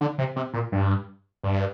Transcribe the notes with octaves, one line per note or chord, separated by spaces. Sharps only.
D3
C3
C3
A#2
G2
G2